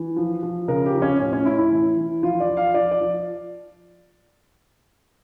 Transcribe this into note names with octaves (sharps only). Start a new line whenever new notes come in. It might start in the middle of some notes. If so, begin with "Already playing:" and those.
Already playing: E3
F3
F3
C#3 A#4
G4
F3
C#4
A2 C#4
C#4
A2 E4
E4
E3
E3
F3 F4
D5
F3
F5
F3 D5
D5
F3